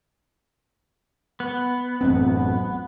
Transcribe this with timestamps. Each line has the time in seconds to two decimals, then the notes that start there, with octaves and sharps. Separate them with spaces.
1.40 B3
2.01 A1 F#2 C4